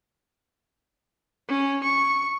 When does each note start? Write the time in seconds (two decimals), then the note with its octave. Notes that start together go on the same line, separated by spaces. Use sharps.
1.49 C#4
1.83 C#6